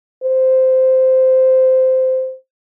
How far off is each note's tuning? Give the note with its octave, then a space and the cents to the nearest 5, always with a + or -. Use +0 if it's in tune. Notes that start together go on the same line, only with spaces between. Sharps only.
C5 -10